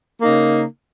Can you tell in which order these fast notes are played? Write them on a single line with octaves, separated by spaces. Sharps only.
A#3 D#4 C#3